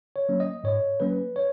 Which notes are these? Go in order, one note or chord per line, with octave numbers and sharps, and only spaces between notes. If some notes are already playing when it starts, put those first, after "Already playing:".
C#5
F#3 A#3 C#4
D#5
G#2 C#5
F#3 A#3 C#4 B4
C#5